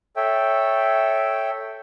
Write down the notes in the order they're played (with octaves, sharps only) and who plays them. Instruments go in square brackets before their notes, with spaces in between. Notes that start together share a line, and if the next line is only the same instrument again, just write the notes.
[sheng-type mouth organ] A4 C#5 E5 G5